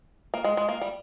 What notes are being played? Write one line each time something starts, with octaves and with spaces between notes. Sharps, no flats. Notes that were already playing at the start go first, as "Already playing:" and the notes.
A#3
G#3
G#3
A#3
G3